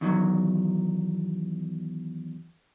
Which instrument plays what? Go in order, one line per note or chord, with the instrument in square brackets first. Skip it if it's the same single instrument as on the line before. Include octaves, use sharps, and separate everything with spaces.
[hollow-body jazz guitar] E2 D#3 E3 F#3